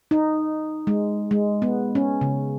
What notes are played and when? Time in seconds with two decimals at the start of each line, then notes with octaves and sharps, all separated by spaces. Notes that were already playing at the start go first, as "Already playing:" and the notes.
0.11 D#4
0.87 G#3
1.31 G#3
1.62 B3
1.95 C#4
2.21 C#3